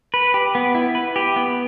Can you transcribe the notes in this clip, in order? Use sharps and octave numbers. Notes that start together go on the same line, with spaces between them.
B4
G4
B3
E4
B4
G4
B3